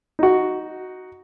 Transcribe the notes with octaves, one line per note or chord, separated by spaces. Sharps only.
D#4 F#4